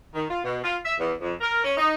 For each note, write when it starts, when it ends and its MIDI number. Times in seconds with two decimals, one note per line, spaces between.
0.15 0.25 51
0.29 0.39 65
0.43 0.58 47
0.63 0.76 65
0.84 0.94 76
0.99 1.13 40
1.21 1.33 41
1.41 1.62 70
1.64 1.73 61
1.77 1.95 63